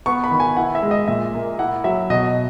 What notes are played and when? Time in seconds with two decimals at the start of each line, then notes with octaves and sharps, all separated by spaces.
0.06 B3 C#6
0.24 B5
0.31 D#3
0.40 G#5
0.57 E4 F#5
0.75 E5
0.82 G#3
0.91 D#5
1.08 A#2 E5
1.34 A#3
1.59 E4 F#5
1.84 F#3 E5
2.10 B2 D#5